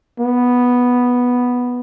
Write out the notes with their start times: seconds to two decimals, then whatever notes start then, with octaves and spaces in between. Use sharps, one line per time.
0.20 B3